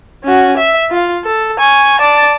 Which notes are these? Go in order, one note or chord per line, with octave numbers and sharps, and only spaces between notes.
C#4 F#4
E5
F4 F5
A4
G#5 C#6
D5 A5